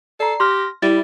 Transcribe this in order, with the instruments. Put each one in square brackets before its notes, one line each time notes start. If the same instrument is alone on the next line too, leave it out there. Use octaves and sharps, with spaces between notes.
[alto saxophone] A4 [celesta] D5 A#5 [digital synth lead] C7
[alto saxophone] G4 [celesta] C6 F6 [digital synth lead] A#6
[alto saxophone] G3 [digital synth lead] E4 [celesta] A6